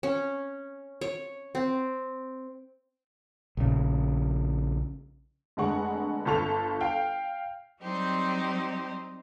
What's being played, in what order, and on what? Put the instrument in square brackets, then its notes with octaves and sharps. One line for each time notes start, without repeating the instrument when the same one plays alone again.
[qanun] C#4
C#5
C4
[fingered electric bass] A#1 C#3
[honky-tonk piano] F1 D3 G#3 F#5 C#6
G1 F4 A4 C#6 F7
F5 G5
[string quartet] F#3 G3 C4 D#4 G4 C5